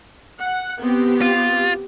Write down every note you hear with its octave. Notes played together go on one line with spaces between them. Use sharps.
F#5
B3 C4 G4
F4